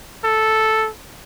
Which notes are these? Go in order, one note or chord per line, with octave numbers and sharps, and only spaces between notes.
A4